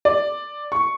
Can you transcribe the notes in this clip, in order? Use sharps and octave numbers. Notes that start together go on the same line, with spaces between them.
D5
C#6